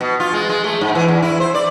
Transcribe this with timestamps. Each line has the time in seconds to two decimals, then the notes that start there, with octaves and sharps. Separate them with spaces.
0.01 B2
0.20 F4
0.33 G#3
0.49 G#3
0.64 A3
0.81 G#2
0.95 E3
1.08 E2
1.22 E4
1.40 C5
1.55 D5